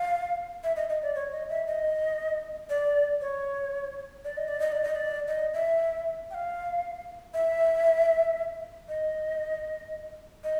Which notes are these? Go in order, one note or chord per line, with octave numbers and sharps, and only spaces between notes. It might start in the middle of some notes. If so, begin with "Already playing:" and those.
Already playing: F5
E5
D#5
D#5
D5
C#5
D#5
E5
D#5
D5
C#5
D5
D#5
D5
D#5
D5
D#5
D5
D#5
E5
G5
F5
E5
D#5
D#5